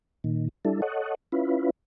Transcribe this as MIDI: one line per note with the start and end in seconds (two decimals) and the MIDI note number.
0.24 0.49 46
0.24 0.49 51
0.65 0.81 55
0.65 0.81 62
0.65 0.81 64
0.65 0.81 69
0.82 1.15 69
0.82 1.15 73
0.82 1.15 75
0.82 1.15 78
1.32 1.70 61
1.32 1.70 64
1.32 1.70 65
1.32 1.70 71